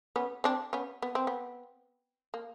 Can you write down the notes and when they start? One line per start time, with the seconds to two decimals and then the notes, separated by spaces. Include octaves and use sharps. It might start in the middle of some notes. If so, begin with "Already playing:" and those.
0.16 B3 C#4
0.44 C4 D4
0.73 B3 C#4
1.02 B3
1.15 C4
1.27 B3
2.34 A#3